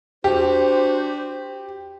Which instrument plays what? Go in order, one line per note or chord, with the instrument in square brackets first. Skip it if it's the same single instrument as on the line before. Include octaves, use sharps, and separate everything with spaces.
[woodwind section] D4 F#4 C5 [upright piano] G4